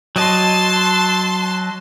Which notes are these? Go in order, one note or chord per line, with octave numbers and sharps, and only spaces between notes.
F#3 D#5 A5 C6